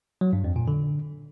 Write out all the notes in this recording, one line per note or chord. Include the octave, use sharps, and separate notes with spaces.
F#3
G2
F2
A#2
D3